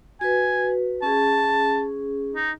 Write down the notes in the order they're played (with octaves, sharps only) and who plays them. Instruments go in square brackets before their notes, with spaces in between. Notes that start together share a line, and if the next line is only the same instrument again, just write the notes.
[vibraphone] F#4 B4 [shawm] G#5
[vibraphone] C#4 G#4 [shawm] A5
[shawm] D#4